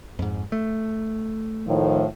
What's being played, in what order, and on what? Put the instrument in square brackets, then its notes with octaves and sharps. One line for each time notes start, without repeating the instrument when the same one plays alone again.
[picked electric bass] F2 G#2
A3
[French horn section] A2 D#3 F3